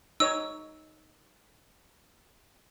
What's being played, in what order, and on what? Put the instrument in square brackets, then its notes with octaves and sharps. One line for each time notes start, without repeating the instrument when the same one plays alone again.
[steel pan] D#4 C#5 [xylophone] E6